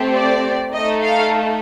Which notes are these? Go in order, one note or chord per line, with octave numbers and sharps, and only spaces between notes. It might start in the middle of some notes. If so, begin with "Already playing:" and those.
Already playing: A3 C4 G4
D5
A3 D#4 A4 D#5
F5